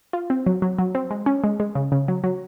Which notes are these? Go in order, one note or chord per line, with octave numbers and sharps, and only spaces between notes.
F4
C4
F#3
F#3
F#3
C4
G#3
C#4
G#3
G#3
C#3
C#3
F#3
F#3